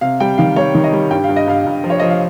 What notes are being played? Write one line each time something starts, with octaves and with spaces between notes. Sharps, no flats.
C3 F5
G3 G5
D#3 F5
G3 C#5
D#3
D#5
G3
G2 G5
G2 F5
D#5
G2 F5
G2
F3
C#5
F3 D#5
F5